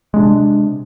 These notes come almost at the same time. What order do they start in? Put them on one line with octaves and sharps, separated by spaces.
G#3 D4 C3